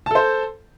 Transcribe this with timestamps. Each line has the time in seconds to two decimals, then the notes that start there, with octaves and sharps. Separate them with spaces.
0.06 A5
0.11 A4
0.15 C5